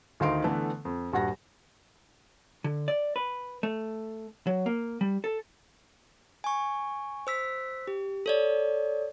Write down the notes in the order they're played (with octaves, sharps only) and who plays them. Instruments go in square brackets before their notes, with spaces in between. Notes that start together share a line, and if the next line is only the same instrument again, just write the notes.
[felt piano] D2 D#3 D#4 F5 C6 D7
D3 E3 A3 B3
F2
D#1 G2 F#4 F#5 A#6
[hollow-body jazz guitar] D3
D5
B4
A3
F#3
A#3
G3
A4
[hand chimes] G#5 C#6
C5 E6 B6
G4
A4 C#5 D5